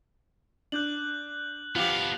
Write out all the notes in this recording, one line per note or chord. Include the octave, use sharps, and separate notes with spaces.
D4 F#6 G6 F#7
F3 B3 D4 G4 F5 F7 F#7